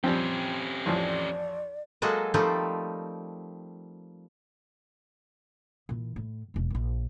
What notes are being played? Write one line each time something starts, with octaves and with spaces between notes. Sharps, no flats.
F2 F3 G3 C4 C#4 G4
A1 F2 F3 D5
F#3 G#3 A#3 F#4 A4 D#5
F3 G3 A3 A#3 C4 D#4
A#2 E3
A2
E1 F#2
A#1 A#2